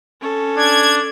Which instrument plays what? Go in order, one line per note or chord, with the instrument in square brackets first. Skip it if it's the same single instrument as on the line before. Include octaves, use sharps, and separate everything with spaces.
[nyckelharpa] C#4 A4
[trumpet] D4 [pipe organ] G#6